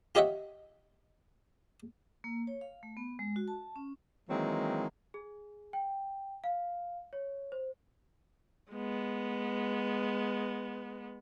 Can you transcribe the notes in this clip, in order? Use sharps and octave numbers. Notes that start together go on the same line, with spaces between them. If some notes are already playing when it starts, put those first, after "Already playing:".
F4 G4 C#5 D#5 E5 F#5
A#3
C#5
F5
A3
B3
G#3
F#4
A5
C#4
D#3 E3 F#3 G#3 A#3 C4
G#4
G5
F5
C#5
C5
G#3 B3